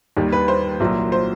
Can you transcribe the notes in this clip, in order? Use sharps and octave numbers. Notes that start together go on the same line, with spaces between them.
D#2 D#3 G3
B4
C5
C2 A#2 F#3
C5